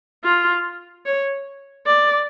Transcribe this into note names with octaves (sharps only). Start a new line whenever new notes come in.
F4
C#5
D5